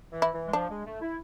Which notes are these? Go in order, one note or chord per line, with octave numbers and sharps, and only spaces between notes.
E3
E4
E3
G#3
F3 D4
G#3
A3
E4